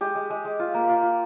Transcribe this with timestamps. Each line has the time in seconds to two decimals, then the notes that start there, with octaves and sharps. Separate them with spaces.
0.01 G#3 G4
0.15 G#3
0.30 G#3
0.45 G#3
0.59 F4
0.74 A#3
0.89 F4
1.03 F4